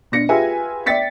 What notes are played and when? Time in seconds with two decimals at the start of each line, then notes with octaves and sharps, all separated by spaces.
0.12 B2 D4 A#6 C#7
0.29 F4 G4 G#4 B4 E5 G#5
0.86 D5 E5 G5 A6 B6 C#7